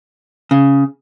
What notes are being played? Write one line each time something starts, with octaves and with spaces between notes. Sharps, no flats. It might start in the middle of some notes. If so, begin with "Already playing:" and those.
C#3